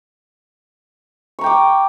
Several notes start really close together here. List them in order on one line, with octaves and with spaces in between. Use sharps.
C#6 A#5 G5 D6